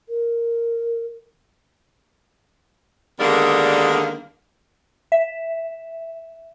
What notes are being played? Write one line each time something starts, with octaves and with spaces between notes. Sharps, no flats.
A#4
D3 D#3 G3 G#3 A#3 B3
E5